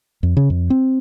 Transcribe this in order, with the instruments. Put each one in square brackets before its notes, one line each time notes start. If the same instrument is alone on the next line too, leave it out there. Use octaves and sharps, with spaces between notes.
[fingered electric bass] F2
C#3
F2
C4